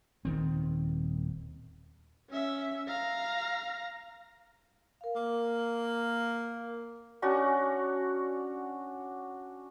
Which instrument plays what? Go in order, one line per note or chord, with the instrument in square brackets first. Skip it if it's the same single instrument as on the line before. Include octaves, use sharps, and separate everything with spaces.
[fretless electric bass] D#1 D#3 C4
[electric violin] C#4 E5
F5 A#5
[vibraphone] A#4 F5
[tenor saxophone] A#3
[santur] C#4 D4 F#4 C#6